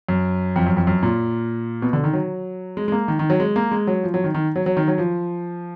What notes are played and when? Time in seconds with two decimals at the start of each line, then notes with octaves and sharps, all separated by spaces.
0.09 F#2
0.56 F2
0.66 F#2
0.77 F2
0.87 F#2
1.03 A#2
1.82 B2
1.93 D3
2.04 D#3
2.13 F#3
2.77 G#3
2.88 G#3
2.92 A#3
3.08 D#3
3.19 D#3
3.30 F#3
3.40 G#3
3.56 A#3
3.72 G#3
3.87 F#3
4.03 F3
4.14 F#3
4.24 D#3
4.35 D#3
4.56 F#3
4.66 F#3
4.77 D#3
4.88 F#3
4.98 F3